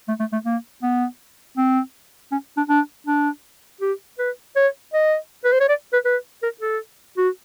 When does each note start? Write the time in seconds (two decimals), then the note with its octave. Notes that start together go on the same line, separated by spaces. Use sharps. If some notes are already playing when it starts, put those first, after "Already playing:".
0.08 A3
0.20 A3
0.33 A3
0.45 A#3
0.83 B3
1.57 C4
2.32 C#4
2.57 D4
2.69 D4
3.07 D4
3.81 G4
4.19 B4
4.56 C#5
4.93 D#5
5.45 B4
5.53 C5
5.60 C#5
5.69 D5
5.93 B4
6.05 B4
6.43 A#4
6.61 A4
7.18 F#4